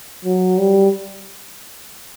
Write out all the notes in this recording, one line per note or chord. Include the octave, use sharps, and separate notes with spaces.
F#3
G3